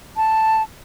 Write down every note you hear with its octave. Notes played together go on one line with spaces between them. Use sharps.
A5